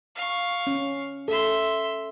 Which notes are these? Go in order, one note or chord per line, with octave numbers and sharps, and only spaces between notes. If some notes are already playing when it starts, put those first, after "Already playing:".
F5 C#6
C#4
A4 E5 C6